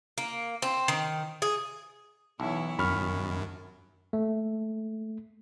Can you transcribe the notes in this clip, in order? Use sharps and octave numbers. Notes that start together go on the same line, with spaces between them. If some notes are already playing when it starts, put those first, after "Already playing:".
A#3
C4
D#3
G#4
B1 E3 E4 C#5
F#2 D#3 B5 C#6 F6
A3